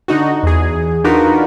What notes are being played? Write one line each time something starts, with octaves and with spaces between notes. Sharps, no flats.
D3 D#4 F#4
E2 G#4
D4 D#4 F4 F#4 A#4 B4